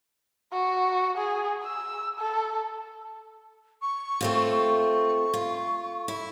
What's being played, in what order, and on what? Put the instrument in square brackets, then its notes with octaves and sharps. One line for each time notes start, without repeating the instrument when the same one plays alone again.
[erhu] F#4
G#4
E6
A4
[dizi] C#6
[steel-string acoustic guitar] A3 C4 F4
[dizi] C#6
[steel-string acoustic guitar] F4
E4